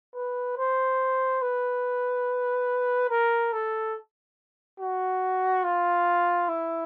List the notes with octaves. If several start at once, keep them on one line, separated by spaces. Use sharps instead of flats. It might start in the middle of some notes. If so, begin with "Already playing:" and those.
B4
C5
B4
A#4
A4
F#4
F4
E4